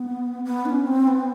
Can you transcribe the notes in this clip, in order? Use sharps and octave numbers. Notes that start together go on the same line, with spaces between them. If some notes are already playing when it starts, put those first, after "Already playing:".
Already playing: B3
B3
D#4
C#4
C4
B3